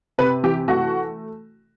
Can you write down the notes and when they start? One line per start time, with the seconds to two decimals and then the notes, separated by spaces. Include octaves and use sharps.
0.18 C3 B4
0.43 E3 G4
0.68 A3 F#4